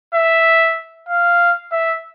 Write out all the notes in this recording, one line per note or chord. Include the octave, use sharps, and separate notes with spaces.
E5
F5
E5